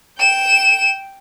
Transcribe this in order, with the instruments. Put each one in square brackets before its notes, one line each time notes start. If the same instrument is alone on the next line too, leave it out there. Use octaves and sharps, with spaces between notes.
[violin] G5 E7